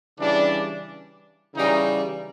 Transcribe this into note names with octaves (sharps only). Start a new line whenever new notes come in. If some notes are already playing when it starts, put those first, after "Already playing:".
C#3 E3 G3 D4
C#3 E3 G3 D#4